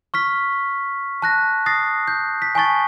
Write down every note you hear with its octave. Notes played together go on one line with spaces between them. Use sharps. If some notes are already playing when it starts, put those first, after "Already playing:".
C#6 F6 B6
A5 F#6 A#6
D#6 A6 A#6 C7
G6
B6
G#5 A5 C#6 A6